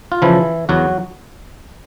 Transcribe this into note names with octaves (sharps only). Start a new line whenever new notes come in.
F4
C#3 E3 F3 E4
E2 F#3 F#4